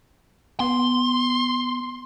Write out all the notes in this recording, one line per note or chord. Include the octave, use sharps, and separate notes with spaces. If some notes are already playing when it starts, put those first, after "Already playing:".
B3 C6